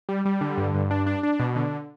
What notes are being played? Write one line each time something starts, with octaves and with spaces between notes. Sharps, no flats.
G3
G3
D3
G2
G2
D4
D4
D4
B2
D3